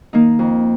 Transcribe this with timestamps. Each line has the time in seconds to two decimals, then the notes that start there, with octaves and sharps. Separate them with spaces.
0.13 D#3 A#3 D#4
0.39 F2